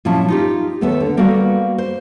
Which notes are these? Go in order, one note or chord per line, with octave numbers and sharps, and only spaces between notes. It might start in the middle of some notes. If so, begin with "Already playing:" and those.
A#2 F3 F#3 C#4 E4 A5
D#4 F4 G4
D#2 A3 B3 A4 E5
D3
G3 A#3 B3 F#4 A4 F5
C5